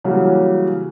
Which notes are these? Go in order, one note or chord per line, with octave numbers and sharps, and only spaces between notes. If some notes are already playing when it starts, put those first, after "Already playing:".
C#3 E3 F#3 G3 A#3 F#4